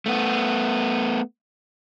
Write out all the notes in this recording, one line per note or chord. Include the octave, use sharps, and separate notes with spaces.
A3 B3